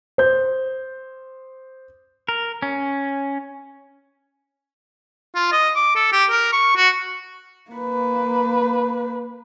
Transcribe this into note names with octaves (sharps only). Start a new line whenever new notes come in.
C5 G6
A#4
C#4
F4
D#5
D6
A4
G4
A#4
C#6
F#4
A#3 B4